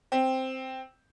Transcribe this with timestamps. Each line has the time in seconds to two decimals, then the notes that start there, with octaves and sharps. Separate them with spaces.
0.12 C4